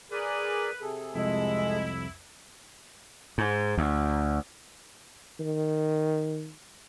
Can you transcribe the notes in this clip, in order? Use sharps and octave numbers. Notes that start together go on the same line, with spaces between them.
G#4 A#4 B4 D5
C3 G#4 A4
C2 F2 G#3 E4
G#2
D2
D#3